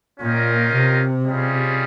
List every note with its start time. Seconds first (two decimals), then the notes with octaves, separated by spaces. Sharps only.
0.20 A#2 C#4 F4 A#4 D#5 G5
0.73 C3
1.25 G3 C#4 F4 G#4 D#5